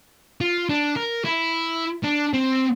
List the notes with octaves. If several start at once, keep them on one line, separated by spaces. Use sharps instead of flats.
F4
D4
A#4
E4
D4
C4